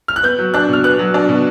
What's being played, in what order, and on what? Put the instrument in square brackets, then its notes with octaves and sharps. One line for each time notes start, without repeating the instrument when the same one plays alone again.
[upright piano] F6
F#6
B3 G6
F#3
D4 F#6
B2 F6
B3 F#6
F#3
D4
B2